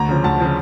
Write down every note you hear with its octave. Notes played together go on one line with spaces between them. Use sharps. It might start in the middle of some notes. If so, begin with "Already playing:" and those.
Already playing: D2 A#5
C#3 F3
D2 A5
C#3 F3